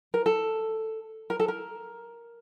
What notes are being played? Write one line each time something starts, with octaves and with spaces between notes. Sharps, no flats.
A#4
A4
A#4
A4
A#4